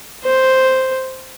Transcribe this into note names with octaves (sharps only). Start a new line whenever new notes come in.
C5